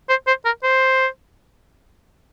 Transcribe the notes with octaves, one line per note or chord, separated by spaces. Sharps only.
C5
C5
A#4
C5